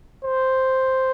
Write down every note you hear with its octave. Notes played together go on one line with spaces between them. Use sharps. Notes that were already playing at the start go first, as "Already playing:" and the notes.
C5